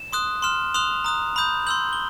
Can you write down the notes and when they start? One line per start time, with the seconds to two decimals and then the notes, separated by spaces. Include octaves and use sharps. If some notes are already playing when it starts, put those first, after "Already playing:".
Already playing: E7
0.13 C6 D#6 F#6
0.42 C6 F6 E7
0.74 C6 D#6 F#6 F7
1.04 A#5 D#6 F#6
1.36 B5 D#6 G6
1.67 C6 E6 G6 F#7
1.93 G7